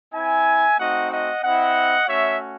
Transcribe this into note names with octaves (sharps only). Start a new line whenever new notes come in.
C4 E4 E5 G#5
A3 C4 D#4 F#4 D#5 F#5
D#5 F#5
C4 E4 D#5 F#5
A3 C#4 F#4 C#5 E5